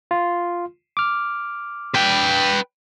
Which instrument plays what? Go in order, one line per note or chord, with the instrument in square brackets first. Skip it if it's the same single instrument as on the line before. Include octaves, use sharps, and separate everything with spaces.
[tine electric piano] F4
D6 F6
[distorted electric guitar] B4 G5